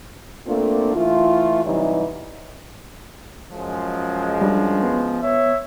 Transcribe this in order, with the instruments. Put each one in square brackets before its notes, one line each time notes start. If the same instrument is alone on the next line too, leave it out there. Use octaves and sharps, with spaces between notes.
[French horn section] A3 A#3 C4 D4 F4
E3 A3 F4
C3 E3 F#3 G3 D#4
[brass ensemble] F#2 F3 G#3
[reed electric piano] G3 D4
B3
[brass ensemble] C#5 E5